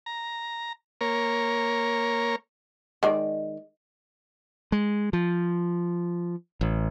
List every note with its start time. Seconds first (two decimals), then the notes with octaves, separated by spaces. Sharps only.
0.06 A#5
1.01 A#3 A#4 C#5
3.03 D#3 G#3 D5
4.72 G#3
5.13 F3
6.61 A1